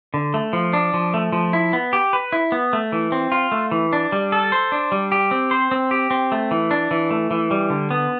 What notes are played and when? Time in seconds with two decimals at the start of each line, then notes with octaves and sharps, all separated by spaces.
0.14 D3
0.34 A3
0.53 F3
0.73 D4
0.94 F3
1.14 A3
1.32 F3
1.53 E4
1.73 B3
1.93 G4
2.13 B4
2.32 E4
2.52 B3
2.73 A3
2.92 E3
3.12 C4
3.32 F4
3.52 A3
3.71 E3
3.93 D4
4.12 G3
4.32 A4
4.52 C5
4.72 D4
4.92 G3
5.12 G4
5.31 C4
5.51 C5
5.71 C4
5.91 G4
6.11 C4
6.32 A3
6.51 E3
6.71 D4
6.91 E3
7.11 A3
7.31 E3
7.51 G3
7.70 D3
7.91 B3